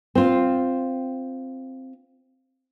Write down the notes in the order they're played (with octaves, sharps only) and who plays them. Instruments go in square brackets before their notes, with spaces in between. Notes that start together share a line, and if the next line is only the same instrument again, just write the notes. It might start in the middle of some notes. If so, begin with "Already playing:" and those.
[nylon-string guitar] C4 F4